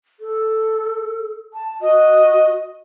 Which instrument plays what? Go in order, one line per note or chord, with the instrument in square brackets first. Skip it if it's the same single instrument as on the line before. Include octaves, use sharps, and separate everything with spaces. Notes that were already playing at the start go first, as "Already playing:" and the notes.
[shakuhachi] A4
A5
[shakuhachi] F#4 [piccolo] D#5